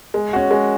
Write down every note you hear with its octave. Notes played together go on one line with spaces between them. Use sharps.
G#3
C#4 F#4
G#3